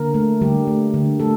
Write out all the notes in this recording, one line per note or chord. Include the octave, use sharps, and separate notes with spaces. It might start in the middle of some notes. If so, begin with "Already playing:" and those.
Already playing: D3 A#3 A#4
A3
D3 G3 G4
A3
D3
A3 A4